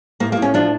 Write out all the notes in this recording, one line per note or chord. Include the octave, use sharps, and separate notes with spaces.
A2 A#3
A2 A#3
C#4
F3 D4